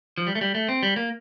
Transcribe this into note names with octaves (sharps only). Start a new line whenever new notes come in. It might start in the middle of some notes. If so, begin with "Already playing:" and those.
F3
G3
A3
G3
A3
C4
G3
A#3